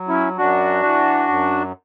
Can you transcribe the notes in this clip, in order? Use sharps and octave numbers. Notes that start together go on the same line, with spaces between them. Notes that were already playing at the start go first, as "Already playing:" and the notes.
Already playing: F#3
C#4 E4
F#2 D4 F#4
E3
F#2